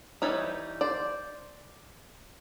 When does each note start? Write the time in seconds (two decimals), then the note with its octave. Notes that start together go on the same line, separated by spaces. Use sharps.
0.22 E3 G3 C4 D#4 B4 C#5
0.81 C5 D5